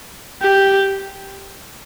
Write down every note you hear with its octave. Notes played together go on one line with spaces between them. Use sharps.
G4